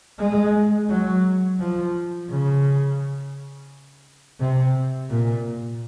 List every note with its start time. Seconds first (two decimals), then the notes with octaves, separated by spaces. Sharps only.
0.19 G#3
0.89 F#3
1.60 F3
2.30 C#3
4.40 C3
5.10 A#2